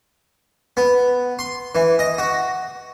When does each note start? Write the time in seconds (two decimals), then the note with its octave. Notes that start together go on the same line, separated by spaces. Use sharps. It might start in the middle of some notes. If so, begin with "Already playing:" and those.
0.77 B3
1.39 C6
1.75 E3
1.99 D#5
2.18 F#4